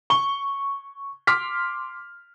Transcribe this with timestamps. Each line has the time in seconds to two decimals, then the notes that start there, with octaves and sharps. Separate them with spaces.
0.10 C#6 G7
1.27 C6 D6 F6 B6